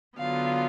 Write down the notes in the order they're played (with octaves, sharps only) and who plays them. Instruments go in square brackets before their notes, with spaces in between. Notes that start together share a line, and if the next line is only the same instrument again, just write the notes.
[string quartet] D3 F#3 B3 F4 [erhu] F5